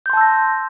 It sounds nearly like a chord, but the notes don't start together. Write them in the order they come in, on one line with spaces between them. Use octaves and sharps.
G6 C6 A5 E6 A#6